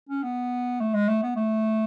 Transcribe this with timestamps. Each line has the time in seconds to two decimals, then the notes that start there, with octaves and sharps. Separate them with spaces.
0.09 C#4
0.23 B3
0.80 A3
0.94 G#3
1.08 A3
1.23 B3
1.36 A3